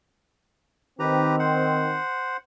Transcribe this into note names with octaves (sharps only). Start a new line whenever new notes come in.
D#3 C4 G4 B4 A#5
C5 F#5